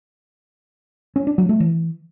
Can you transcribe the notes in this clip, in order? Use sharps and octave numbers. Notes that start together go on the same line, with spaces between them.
C#4
D4
F#3
A3
E3